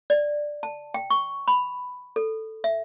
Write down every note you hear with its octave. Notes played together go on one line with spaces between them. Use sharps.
D5
A5
G5
C#6
B5
A4
E5